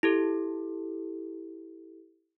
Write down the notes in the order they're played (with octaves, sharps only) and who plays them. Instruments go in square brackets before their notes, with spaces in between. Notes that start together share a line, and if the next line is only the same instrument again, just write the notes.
[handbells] E4 G4 A4